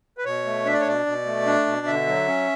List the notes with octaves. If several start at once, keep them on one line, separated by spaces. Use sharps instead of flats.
B4
B2 C#5
A3
D4 E5
D5
C#5
B2 D5
B2
A3
D4
B2
D3 E5
F#3
C#4